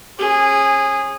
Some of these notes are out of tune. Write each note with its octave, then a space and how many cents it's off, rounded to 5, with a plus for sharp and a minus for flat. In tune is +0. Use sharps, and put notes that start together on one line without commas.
C#4 -30 G#4 -15